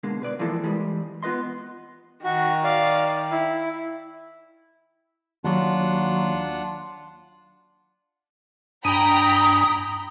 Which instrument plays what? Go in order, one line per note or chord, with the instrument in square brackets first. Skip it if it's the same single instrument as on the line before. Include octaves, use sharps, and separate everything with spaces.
[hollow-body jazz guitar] B2 D3 G#3 A#3
B2 B4 D5
E3 F3 G#3 A#3 E4 A4
E3 G3 G#3
B3 F4 B4 D#5 C6
[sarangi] D#3 [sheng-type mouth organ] F#4
[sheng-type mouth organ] D5 F5
E4
[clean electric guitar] D#2 F#3 [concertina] D4 F4 F#5
[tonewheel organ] G2 D4 G#5 [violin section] G5 A#5 B5 [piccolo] D#6